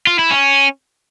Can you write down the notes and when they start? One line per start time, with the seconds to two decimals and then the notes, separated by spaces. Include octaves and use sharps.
0.07 F4
0.19 E4
0.31 C#4